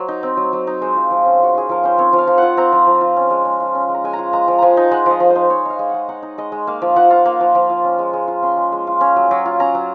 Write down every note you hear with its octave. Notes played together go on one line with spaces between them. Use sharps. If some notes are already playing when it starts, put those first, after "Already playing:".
Already playing: F#3 C5
D#4
C4
F#3
F#3
D#4
G#3 C5
F4
F3
C#4
G#3 F#4
F4 G#4
F3 A#4
C#4 C5
C4 C#5
F3
F5
F3
F4 F#5
C4 A#5
F3
F3
F4
C#4
G#3
G#3
F4
C#4
G#3
A#5
G#3 G#5
A#5
F4
G#3 A#5
F3
F3 G#5 A#5
D#4
G#3 F#5
F3 D#5
F3
C5
D#4
D#4 C#5
D#4 F5
G#3
G#3 F#5
D#4 F#5
D#4
G#3 D#5
G#3
A#3 F5
F3
F3 F#5
F4
A#3
F3
F3
F4
C#4
G#3
G#3
F4
C#4 C6
G#3
G#3
F4
C#4
F#3
F#3
F4
C#4 A#5
F#3